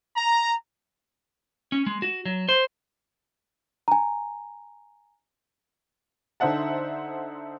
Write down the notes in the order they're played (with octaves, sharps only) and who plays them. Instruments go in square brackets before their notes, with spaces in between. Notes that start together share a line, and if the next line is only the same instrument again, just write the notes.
[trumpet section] A#5
[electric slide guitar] C#4
G#3
F#4
F#3
C5
[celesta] G#5 A#5
[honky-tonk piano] D3 D#4 C5 E5 F#5 A5